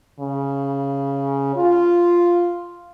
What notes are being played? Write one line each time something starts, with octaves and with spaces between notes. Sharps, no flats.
C#3
F4